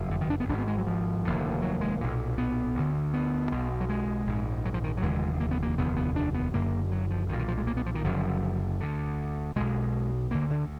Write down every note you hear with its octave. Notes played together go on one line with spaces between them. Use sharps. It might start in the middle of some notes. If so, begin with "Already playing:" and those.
Already playing: F#1 F2
D3
D#3
D4
B3
G#1 G#2 D4
B3
G#3
F#3
F3
F1 D#2 D3
F#3
G#3
B1 A#2
B3
D2 D3
B3
B1 B2
F#3
G#3
A#1 G#2
F#3
F3
D#3
F#3
F1 D#2 D3 G#3
A#3
B3
A#3
F1 D#2 D3 B3
B3
D4
B3
F#1 F#2 D3 A#3
F#3
F3
B1 A#2 D#3
D#3
F3
G#3
A#3
B3
F3
D#3
F#1 F#2 D3 F3
D2 D3
B1 B2 G#3
D2 D3 A#3
D3